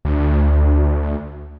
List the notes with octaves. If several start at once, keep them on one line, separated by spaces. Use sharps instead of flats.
D2